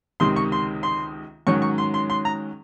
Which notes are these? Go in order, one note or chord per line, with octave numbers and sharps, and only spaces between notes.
C#2 C3 D#3 C6
C#6
C6
C6
G#2 D#3 F#3 C#4 C#6
C#6
C6
C6
C6
A#5